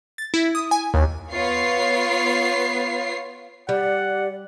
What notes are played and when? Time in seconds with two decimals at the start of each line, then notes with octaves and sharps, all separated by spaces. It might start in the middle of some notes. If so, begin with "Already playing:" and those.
0.18 A6
0.34 E4
0.55 D#6
0.71 G#5
0.94 D#2
1.32 B3 F4 C#5 C7
3.69 G3 G4 D5 F#5